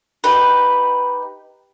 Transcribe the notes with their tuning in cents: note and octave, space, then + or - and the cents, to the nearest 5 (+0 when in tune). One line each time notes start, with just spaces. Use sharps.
D#4 +0 G4 +0 B4 +0